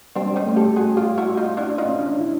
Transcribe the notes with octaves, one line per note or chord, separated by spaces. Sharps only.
G3 C4 D4
C#4 D#4
A3
G4 A4
F#4 G#4
F4 G4
E4 F#4
D#4 F4
D4 E4
D#4 F4
C#4
D4
E4